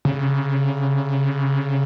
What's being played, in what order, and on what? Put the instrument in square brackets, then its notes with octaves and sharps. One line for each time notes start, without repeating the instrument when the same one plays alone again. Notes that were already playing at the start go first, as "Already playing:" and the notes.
[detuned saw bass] C#3